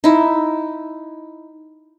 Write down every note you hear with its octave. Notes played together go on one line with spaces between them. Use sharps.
D#4 E4